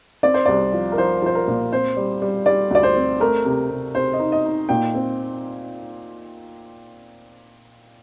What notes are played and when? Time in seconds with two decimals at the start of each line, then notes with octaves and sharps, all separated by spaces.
0.23 C4 D5
0.34 C5
0.46 C2 D5
0.73 F3
0.92 A#4
0.98 F3 C5
1.22 F3 C5
1.35 A#4
1.48 A#2
1.72 C4 C5
1.97 G3
2.22 G3
2.46 G3 D5
2.71 D2 D5
2.83 C5
2.96 C4
3.20 A3 A#4
3.45 C3
3.70 C3
3.95 C3 C5
4.13 D#5
4.20 D#4
4.32 D#5
4.45 D#4
4.69 A#2 G5
4.94 C4